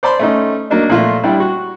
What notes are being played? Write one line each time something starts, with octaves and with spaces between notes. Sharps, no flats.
C5 D5 A5 B5 C6
A3 C#4 D#4
F#3 A#3 D4 D#4
A#2 F3 A3 F4
G3 D4 E4 G4
F#4